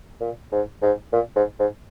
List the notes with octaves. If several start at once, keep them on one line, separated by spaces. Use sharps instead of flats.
A#2
G#2
G#2
A#2
G#2
G#2